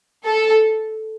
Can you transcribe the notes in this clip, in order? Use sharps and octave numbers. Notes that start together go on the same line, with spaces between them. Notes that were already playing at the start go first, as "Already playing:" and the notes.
A4